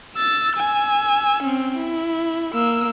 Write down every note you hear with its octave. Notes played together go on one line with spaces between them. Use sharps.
E6 A6
G#5 E6
C4 C#4
E4
A#3 E6